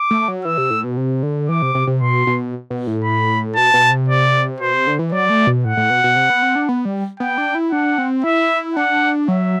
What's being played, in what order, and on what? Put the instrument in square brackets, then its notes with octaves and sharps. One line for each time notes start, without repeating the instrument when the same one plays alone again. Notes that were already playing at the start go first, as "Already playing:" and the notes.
Already playing: [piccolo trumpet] D6
[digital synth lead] A3
F#3
[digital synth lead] E3 [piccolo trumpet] E6
[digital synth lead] C3
A2
B2
C3
D3
[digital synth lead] E3 [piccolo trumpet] D6
[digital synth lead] C3
C3
C3
[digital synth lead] B2 [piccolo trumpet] C6
[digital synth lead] B2
B2
A2
[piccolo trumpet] B5
[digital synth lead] B2 [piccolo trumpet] A5
[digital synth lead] B2
C3
[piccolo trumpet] D5
[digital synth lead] B2 [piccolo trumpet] C5
[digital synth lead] C3
D3
E3
[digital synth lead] F#3 [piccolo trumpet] D5
[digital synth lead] A3
B2
[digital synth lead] A2 [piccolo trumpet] F#5
[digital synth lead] A2
B2
B2
C3
B3
C4
D4
B3
G3
[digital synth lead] B3 [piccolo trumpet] G5
[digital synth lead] D4
E4
[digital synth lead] D4 [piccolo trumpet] F#5
[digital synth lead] C4
[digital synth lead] E4 [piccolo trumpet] E5
[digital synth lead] D4 [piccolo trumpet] F#5
[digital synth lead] F#3 [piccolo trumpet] E5